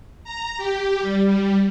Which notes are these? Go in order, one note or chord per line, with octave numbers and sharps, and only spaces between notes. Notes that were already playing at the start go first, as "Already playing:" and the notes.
A#5
G4
G3